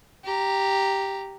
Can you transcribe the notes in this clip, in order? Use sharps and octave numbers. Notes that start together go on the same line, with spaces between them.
G4 A#5